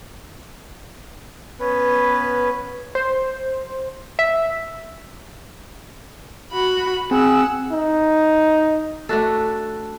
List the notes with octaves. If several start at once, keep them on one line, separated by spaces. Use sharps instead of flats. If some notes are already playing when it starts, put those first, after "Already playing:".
B3 C#4 B4
C5
E5
F#4 B5
C4 G#4 F#5 E6
D#4
A3 D4 F#4 A4